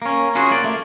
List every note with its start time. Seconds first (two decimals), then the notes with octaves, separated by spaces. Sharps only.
0.02 A#3 C#4
0.35 C#4 F4 F#4 G#4
0.51 A#3 D5
0.64 A3